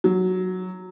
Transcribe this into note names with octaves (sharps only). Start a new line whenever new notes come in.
F#3